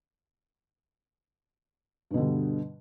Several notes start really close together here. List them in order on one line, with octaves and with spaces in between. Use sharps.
G2 B2 D3 G3